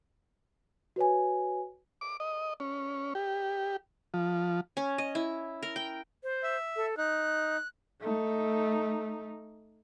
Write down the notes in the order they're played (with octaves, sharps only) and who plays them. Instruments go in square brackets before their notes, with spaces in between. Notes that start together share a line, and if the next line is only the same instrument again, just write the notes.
[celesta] F#4 B4 C#5 G#5
[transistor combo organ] D6
D#5
C#4
G4
F3
[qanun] C#4
D#5
E4
A#4
G5
[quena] C5
[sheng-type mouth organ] E5
[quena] A4
[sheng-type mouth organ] D#4 [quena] F#6
[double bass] A3 D#4